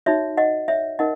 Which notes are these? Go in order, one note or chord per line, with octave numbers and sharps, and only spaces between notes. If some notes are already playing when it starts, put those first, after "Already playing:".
D#4 F#4 C#5 E5
D#5 F#5
C#5 E5
D#4 A#4 D#5 F#5